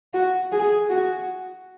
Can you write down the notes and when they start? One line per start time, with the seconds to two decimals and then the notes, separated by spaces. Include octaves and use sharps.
0.14 F#4
0.52 G#4
0.90 F#4